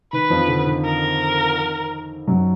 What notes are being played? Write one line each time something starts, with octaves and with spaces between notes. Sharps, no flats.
D#3 B4
F2 F3
D3
D#3
A#4
F#2 F#3